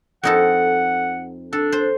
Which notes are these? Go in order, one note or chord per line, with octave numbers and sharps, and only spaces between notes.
F2 D#4 A4 F#5
D4 A4
C5